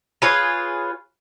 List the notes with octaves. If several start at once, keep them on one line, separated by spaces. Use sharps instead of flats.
F4 G#4 B4 C#5